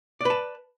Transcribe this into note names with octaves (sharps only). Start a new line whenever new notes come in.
B4 D5 A5